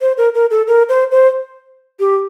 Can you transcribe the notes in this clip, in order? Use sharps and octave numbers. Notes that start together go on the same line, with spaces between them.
C5
A#4
A#4
A4
A#4
C5
C5
G4